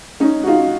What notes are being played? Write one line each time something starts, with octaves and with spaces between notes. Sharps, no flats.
C#4 D#4
F#4
D#4 F4